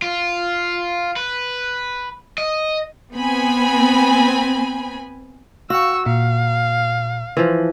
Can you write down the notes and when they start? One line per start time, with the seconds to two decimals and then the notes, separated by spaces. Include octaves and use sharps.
0.02 F4
1.16 B4
2.38 D#5
3.15 B3 C4 G#5 B5
5.70 F#4 F5 G5 C#6 E6
6.06 A#2 F5
7.37 E3 F3